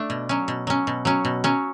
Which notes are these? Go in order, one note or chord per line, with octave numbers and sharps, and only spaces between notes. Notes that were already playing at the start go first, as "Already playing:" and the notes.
Already playing: A3 D4
B2
F#3 C#4
B2
F#3 C#4
B2
F#3 C#4
B2
F#3 C#4